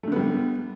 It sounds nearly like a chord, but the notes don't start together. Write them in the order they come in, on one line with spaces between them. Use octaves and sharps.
A3 D3 B3 G3